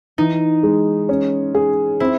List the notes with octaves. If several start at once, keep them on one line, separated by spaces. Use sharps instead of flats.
E3 D#4
G#3
C#4
G#4
C4 E4